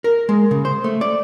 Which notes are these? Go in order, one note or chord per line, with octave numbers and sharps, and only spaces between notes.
A#4
G#3
C#3
C5
A3
D5